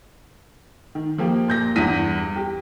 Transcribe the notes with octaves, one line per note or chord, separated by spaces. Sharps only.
D#3
F3 A#3 G4
A#2 G6 A#6
E2 G2 A#6 B6 D#7
G4